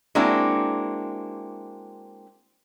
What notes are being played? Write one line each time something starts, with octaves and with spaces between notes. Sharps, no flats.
G#3 A#3 C4 D4 E4 F#4